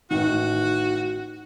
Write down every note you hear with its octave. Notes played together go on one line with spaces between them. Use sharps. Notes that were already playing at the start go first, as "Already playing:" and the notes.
A1 D#3 F#4